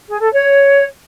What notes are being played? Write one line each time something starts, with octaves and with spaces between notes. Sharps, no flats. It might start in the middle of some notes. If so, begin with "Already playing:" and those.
G#4
A4
C#5